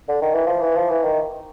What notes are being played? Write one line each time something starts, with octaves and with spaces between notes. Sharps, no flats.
D3
D#3
E3
F3
E3
F3
E3
D#3